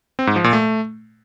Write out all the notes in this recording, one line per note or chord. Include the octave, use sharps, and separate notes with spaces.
C4
G#2
F3
A#2
A3